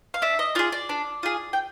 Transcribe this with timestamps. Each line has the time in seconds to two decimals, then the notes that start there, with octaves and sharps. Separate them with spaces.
0.14 F5
0.22 D4 E5
0.39 D#5
0.55 F4 G#4 D5
0.72 D5
0.89 D4
1.23 F4 G#4
1.53 G5